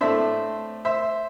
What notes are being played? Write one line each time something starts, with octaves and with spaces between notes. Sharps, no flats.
A2 A3 D4 C5 E5
C5 E5